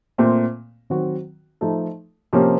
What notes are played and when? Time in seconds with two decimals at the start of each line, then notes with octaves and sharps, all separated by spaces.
0.18 A#2 A3 C4
0.90 D#3 F#3 C4 F#4
1.61 F3 A3 D#4 A4
2.33 C3 F3 A#3 C#4